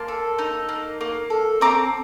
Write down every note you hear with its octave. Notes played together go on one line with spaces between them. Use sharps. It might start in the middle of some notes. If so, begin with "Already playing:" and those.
Already playing: A#3 A5 C6
A4
D#4
A#3
A#3
A4
C4 A#5 D6